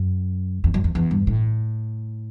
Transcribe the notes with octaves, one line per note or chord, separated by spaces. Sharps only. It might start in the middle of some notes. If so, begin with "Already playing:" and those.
Already playing: F#2
E2
F#2
E2
E2
G2
A2